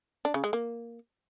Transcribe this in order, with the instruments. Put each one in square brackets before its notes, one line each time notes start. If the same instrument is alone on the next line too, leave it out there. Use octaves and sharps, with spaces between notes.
[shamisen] D4
C#3
G#3
A#3